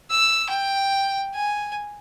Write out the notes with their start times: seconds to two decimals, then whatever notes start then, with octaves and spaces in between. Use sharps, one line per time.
0.10 E6
0.49 G5
1.34 G#5